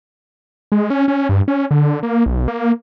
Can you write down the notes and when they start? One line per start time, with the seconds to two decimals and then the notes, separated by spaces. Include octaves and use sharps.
0.72 G#3
0.90 C#4
1.08 C#4
1.29 G2
1.48 C#4
1.71 D3
2.03 A#3
2.26 B1
2.48 A#3